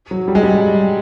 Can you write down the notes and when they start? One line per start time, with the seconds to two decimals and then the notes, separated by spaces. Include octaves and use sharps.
0.11 F#3
0.28 G3
0.35 G#3
0.43 G3